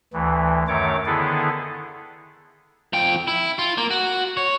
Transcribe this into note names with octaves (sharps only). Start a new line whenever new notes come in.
D2 E3
F#2 D#3 A3 C#5 D6
D3 D#3 B3 E4 G#4 A4
F3 G5
E4
F4
A#3
F#4
C#5